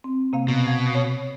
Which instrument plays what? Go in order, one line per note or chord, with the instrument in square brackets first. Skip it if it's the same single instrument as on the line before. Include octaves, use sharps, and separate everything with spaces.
[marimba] C4
C3 A#3 F5
[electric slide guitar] B2
[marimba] F5 G#6
C#5